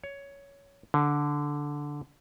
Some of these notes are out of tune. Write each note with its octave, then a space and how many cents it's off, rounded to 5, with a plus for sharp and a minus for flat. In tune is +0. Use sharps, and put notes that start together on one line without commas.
C#5 +10
D3 -5